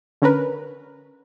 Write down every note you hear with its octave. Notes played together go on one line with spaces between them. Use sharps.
D3 C#4 A#4 B4